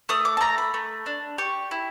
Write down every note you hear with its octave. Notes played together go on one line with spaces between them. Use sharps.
A3 D#6
D6
A5
A3 A#5
B5
A3
D4
G4 C#6
E4